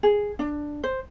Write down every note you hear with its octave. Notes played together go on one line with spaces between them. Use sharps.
G#4
D4
C5